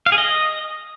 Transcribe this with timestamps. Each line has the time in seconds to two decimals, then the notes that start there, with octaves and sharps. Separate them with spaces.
0.06 F5
0.12 G#4
0.18 D#5